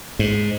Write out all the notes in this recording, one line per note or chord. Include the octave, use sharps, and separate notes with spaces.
G#2